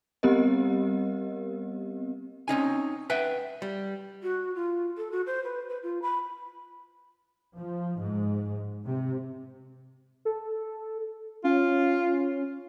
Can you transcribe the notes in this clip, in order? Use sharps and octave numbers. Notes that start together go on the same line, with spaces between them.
G3 B3 C4 G4 A#4 D#5
C4 C#4 D#4 G#5
B4 E5 F#5 G5
G3
F#4
F4
A4
F#4
C5
B4
B4
F4
B5
F3
G#2
C3
A4
C#4 F4